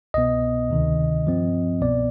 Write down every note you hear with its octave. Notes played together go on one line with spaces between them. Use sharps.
C2 B2 B3 D#5
D2 C3 D#3
G2 F3 C4
C2 B2 B3 D5